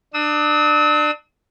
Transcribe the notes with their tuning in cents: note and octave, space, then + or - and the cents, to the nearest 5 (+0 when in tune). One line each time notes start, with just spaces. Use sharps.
D4 +25 E6 -45